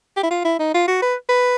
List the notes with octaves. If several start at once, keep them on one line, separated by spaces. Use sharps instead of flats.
G4
E4
F4
E4
D#4
F4
F#4
B4
B4